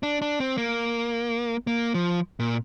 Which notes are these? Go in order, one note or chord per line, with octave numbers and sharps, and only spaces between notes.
D4
D4
C4
A#3
A#3
F3
A#2